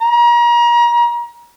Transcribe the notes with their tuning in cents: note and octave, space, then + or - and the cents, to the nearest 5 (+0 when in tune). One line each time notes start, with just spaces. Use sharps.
A#5 +35